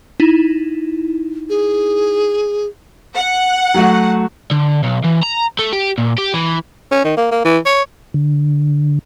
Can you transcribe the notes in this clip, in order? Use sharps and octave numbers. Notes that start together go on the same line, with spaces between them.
D#4 E4
G#4
F#5
F#3 A3 F#4
D3
B1
E3
A#5
A3
G4
A#2
G4
E3
C#4
D#3
A#3
A#3
E3
C#5
D3